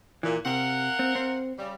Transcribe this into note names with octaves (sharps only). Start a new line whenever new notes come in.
A#2 E3
C3 A#4 F5 F#5
C4
C4
C#3 G3